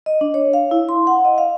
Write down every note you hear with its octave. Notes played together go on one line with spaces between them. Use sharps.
D#5
D4
C#5
F5
E4
C6
F#5
D#5
F5